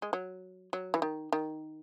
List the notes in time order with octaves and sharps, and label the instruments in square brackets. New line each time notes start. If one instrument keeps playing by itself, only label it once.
[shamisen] G#3
F#3
F#3
E3
D#3
D#3